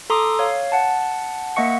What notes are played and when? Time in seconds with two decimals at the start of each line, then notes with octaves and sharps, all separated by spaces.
0.10 A4 A#5 C6 D6 D#6
0.39 C#5 F5
0.72 F#5 A5
1.56 A#3 D#5 E5 F#5 C#6 C#7